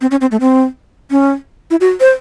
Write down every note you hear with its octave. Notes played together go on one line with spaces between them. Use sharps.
C4
C#4
C4
A3
C4
C#4
E4
F#4
C5